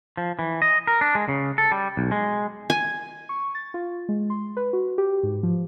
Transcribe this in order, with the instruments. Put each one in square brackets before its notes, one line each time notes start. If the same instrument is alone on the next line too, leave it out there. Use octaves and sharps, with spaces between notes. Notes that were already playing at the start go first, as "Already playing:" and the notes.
[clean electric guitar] F3
E3
D#5
A#4
D4
G#3
C#3
A4
G3
B1
G#3
[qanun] G#5
[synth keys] C#6
A6
F4
G#3
C6
B4
F#4
G4
G#2
F3